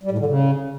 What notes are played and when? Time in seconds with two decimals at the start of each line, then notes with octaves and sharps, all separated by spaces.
0.03 G3
0.11 A2
0.18 D3
0.26 C#3